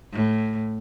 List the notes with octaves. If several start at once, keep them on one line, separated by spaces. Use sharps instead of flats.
A2